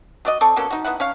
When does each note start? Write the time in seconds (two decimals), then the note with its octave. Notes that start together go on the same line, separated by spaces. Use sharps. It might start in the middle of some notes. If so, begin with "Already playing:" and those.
0.25 F#3 D5 D#5
0.41 C4 A4 D5 C#6
0.56 B2 A#3 C#4 A4
0.71 D#4 F#4
0.85 B3 D#4 E4 F#5
1.00 C#4 C#5 F5